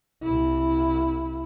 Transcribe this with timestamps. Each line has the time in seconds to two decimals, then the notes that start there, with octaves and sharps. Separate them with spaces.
0.22 C2 E4